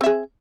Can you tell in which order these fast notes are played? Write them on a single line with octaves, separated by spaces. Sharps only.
C4 E5 G#4